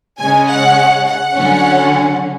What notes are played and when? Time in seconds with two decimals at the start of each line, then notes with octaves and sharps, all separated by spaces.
0.19 C#3 G#3 C#4 G#5
0.49 F#5
1.06 F#5
1.36 D3 F#3 C#4